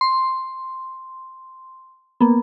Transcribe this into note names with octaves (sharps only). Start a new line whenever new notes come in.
C6
A#3 B3